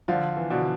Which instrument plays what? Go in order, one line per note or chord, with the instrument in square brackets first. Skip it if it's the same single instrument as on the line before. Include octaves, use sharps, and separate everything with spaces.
[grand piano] D3 F3 [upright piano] F4
[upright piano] E3
[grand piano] B2 D3